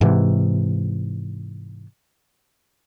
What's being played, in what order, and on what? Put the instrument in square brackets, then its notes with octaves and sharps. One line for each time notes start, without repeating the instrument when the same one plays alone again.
[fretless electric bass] G#2 C3 E3